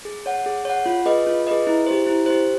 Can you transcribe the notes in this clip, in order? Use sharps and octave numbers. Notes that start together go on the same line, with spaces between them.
G#4
C#5 F#5
G#4
C#5 F#5
F4
G#4 B4 D#5
F4
G#4 B4 D#5
E4
G4 C5
E4
G4 C5